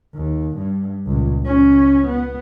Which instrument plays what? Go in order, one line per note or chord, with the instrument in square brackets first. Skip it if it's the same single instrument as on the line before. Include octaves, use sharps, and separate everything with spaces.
[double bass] D#2
G2
C#2 A#2
C#2 C#4
B3